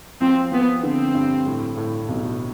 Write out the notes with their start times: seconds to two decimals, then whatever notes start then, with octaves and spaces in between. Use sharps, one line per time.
0.21 F3 C4
0.52 F3 B3
0.83 D3 C4
1.15 G2
1.46 A2
1.77 A2
2.09 B1